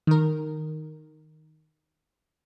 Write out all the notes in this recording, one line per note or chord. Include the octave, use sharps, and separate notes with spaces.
D#3 A#4